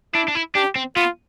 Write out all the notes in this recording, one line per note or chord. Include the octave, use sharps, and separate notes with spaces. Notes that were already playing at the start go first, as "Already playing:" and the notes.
D4 E4
D4
E4
D4 G4
C4
B3 F4